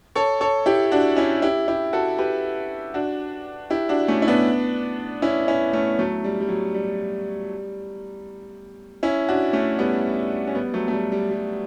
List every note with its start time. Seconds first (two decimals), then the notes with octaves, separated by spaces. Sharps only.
0.15 A4 C#5
0.41 A4 C#5
0.66 E4 G4
0.92 D4 F#4
1.16 C#4 E4
1.42 E4 G4
1.68 E4 G4
1.93 F#4 A4
2.18 G4 B4
2.94 D4 F#4
3.70 E4 G4
3.89 D4 F#4
4.08 A3 C#4
4.22 E4
4.28 B3 D4
5.22 C#4 E4
5.48 C#4 E4
5.73 A3 C#4
5.99 F#3 A3
6.24 G3
6.40 G3
6.49 F#3
6.74 G3
9.03 C#4 E4
9.29 D4 F#4
9.53 A3 C#4
9.79 G3 B3
10.47 C#4
10.55 G3 B3
10.73 F#3 A3
10.88 A3
10.93 G3
11.12 G3
11.31 G3